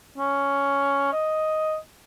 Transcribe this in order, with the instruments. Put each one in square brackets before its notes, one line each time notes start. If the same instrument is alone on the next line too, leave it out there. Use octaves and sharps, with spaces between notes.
[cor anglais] C#4
D#5